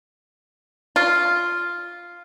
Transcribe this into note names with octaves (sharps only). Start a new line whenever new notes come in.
F4